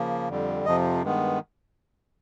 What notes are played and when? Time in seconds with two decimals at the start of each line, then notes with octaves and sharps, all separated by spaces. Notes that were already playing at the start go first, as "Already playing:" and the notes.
Already playing: C#3 F3 A#3
0.29 F2 D3 G3
0.66 F2 C3 F3 D#5
1.02 G2 D#3 G#3 B3